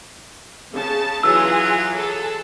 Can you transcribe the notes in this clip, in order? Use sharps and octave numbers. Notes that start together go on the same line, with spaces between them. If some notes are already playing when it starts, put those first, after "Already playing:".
C#3 A5
E3 F#3 F4 G#4 E6
G#4 A4